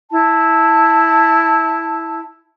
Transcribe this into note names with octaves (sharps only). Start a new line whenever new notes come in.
E4 A5